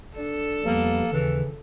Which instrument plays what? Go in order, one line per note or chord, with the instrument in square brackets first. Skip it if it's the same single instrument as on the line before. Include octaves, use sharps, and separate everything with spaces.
[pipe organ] D4 [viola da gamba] A4
[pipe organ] F2 G3 B3 [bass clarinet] A#3
[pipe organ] D#2 [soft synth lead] C#3 [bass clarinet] E3